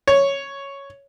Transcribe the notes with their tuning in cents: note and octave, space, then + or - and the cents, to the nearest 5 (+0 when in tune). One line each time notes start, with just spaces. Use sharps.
C#5 +0